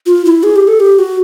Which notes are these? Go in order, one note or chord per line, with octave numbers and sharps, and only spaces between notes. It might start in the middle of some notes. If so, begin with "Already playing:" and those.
F4
E4
G#4
G4
A4
G4
F#4